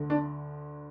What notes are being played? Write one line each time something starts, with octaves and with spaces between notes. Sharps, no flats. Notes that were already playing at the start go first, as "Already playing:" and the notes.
Already playing: D2 D3
D4